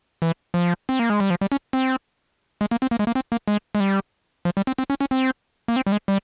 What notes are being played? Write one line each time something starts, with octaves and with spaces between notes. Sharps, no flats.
E3
F3
C4
A#3
G#3
G3
F3
G3
C#4
C4
G#3
A#3
C4
A#3
G#3
A#3
C4
A#3
G#3
G#3
G3
F3
G3
C4
C4
C#4
C#4
C4
A#3
C4
G3
G#3
G3